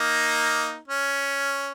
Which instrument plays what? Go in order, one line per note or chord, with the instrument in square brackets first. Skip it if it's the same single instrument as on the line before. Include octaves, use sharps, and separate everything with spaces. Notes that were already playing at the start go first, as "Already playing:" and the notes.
Already playing: [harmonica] A#3 D#4
C#4